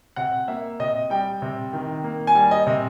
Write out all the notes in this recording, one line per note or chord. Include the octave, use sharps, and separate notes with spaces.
C3 F#5
A#3 E5
C3 D#5
G3 G5
C3
D#3
A#3
G#5
G3
D#5
C3